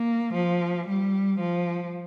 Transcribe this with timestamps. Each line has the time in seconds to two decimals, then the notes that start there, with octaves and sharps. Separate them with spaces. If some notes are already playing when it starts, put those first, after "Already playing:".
Already playing: A#3
0.33 F3
0.86 G3
1.39 F3